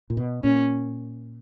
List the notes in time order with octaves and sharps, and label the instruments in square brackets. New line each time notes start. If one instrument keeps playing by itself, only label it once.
[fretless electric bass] A#2
B2
[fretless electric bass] A#2 [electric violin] C#4